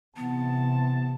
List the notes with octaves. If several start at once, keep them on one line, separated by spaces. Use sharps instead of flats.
C3 E3 B3 A5